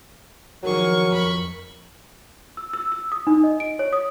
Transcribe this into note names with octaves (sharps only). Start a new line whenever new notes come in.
D#3 F3 F#3 G#4 A#4 C#6
F2 B5 C#6
E6
E6
E6
D#6
D#4
D#5
D7
C#5
D#6